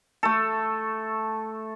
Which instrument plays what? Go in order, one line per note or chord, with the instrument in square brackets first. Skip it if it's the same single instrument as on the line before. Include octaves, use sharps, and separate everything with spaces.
[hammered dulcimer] A3 A4